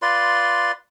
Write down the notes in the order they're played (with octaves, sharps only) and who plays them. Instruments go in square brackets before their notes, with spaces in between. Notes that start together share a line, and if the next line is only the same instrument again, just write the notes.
[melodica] F4 B4 D5 C6